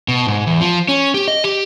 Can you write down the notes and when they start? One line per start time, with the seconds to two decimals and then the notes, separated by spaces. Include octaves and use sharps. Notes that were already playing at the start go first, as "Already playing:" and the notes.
0.08 B2
0.27 G#2
0.47 E2
0.61 F3
0.88 C#4
1.14 G4
1.28 D#5
1.44 G4